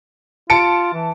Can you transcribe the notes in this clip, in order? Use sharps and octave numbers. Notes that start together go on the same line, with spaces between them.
F4 A5 C#7 D7
E3